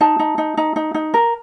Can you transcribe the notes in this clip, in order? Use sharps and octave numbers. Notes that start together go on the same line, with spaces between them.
D#4 A5
D#4
D#4
D#4
D#4
D#4
A#4